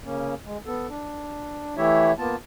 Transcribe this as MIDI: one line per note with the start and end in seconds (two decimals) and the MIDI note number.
0.04 0.34 49
0.04 0.34 58
0.04 0.34 61
0.45 0.58 56
0.66 0.88 59
0.66 0.88 69
0.89 1.75 62
1.77 2.12 52
1.77 2.12 57
1.77 2.12 64
1.77 2.12 67
1.77 2.12 73
1.77 2.12 76
2.18 2.36 58
2.18 2.36 59
2.18 2.36 65
2.18 2.36 81